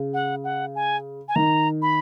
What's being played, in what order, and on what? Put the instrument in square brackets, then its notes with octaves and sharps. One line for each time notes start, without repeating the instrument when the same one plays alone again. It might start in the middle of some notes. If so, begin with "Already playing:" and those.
Already playing: [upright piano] C#3
[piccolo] F#5
F#5
G#5
G#5
[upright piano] D#3 [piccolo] A#5
[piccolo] B5